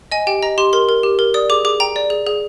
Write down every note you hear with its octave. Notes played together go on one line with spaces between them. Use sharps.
D#5 G#5
G4 G5
D#5 A#5
G4 C6
A#4 C6
A#4
G4
A#4
D5 D#6
G#4 D6
G#4 D6
G5 A#5
D5
G#4
G#4